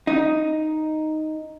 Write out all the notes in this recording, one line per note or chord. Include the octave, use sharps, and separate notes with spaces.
D#4